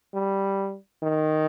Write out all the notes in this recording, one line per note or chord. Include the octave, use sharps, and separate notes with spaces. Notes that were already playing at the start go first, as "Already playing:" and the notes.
G3
D#3